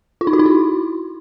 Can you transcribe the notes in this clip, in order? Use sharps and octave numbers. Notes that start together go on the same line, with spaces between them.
F4
D#4
F#4
D#4
E4